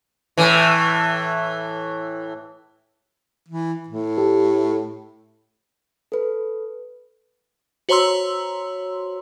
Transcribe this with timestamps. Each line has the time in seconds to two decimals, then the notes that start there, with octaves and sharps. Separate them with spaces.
0.38 A2 E3
3.48 E3
3.88 A2
4.18 G4 A4
6.12 A4 B4
7.89 F#4 C5 C#5 A#5 C6 E6